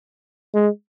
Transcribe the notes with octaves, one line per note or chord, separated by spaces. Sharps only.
G#3